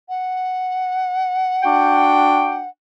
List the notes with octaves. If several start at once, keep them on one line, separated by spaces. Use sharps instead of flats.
F#5
D4 F#4 G5